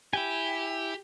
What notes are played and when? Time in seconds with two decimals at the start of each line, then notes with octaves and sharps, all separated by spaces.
0.13 E4 G4 G5 G#5